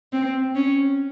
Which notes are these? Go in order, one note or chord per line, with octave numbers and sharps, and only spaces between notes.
C4
C#4